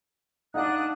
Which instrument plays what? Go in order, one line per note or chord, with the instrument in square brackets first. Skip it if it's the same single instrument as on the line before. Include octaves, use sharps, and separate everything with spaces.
[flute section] D4 D#6 F#6 [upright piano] D#4 F5 F#5